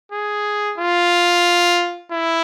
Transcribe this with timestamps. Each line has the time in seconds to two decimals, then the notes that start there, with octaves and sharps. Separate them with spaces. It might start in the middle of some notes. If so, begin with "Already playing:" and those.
0.12 G#4
0.78 F4
2.12 E4